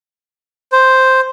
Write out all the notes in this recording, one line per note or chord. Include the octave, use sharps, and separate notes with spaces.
C5